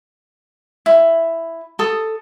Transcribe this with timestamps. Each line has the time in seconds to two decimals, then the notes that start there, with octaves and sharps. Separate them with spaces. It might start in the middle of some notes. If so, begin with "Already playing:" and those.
0.86 E4
1.79 A4 D#6